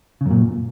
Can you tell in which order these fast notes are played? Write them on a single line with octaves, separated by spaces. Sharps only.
C#3 F#2 A#2